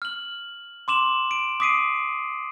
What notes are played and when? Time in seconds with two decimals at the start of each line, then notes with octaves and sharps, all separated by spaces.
0.02 F6 F#7
0.88 C6 D6 E7 F#7
1.31 D7
1.60 D6 D#6 B6 C7 D7 D#7